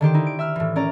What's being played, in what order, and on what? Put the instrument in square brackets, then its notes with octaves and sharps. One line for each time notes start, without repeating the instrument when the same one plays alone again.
[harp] D3 D#3 G4 C5
D#4 E4
D7
E5 E6 F6
A2 E3
C#4 A#4 D5 A#5